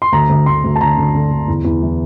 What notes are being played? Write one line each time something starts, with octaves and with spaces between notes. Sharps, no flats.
C6
D2 A#5
D2
D2 C6
D2
A5
D3 A#5
D3
D3
D3
E2
E2
E3